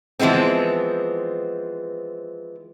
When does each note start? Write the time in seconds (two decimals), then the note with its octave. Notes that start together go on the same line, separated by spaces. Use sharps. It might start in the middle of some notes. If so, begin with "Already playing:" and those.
0.19 E3 F3 G#3 B3 C4